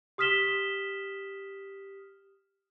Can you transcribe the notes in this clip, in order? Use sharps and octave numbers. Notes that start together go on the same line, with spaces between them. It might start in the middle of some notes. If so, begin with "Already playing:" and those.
G4 D#6 F6 B6 E7 G7